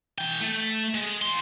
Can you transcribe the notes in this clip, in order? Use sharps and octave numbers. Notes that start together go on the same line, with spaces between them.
E3 G5
A3
G#3
E3 C6